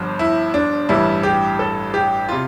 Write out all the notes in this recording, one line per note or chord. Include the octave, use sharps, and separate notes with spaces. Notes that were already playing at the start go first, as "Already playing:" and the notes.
Already playing: G1 G2 F3
E4
D4
A1 G2 E3 G3 E4
G4
A4
G4
C3 F4